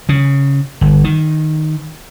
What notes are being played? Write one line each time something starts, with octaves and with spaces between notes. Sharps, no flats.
C#3
G1
D#3